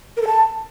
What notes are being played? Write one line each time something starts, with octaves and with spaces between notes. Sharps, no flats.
A#4
A4
A5